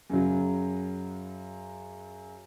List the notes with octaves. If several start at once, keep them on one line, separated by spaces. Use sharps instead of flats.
F#2 C#3 F#3